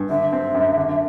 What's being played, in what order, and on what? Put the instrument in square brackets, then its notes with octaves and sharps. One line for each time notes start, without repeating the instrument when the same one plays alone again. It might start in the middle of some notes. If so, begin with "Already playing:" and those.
Already playing: [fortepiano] G2
[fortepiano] D3 [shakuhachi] E5
[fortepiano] C4
F#2
D3